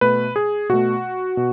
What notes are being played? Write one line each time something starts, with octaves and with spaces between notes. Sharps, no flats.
B2 A3 B4
G#4
B2 A3 F#4
B2